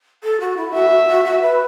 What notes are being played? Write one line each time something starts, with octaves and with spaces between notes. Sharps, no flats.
A4
F#4
E4
F#4 E5
F#4
F#4
F#4
B4